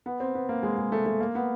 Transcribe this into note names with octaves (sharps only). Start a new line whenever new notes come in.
B3
C4
B3
A#3
G#3
G#3
A3
A3
A#3
B3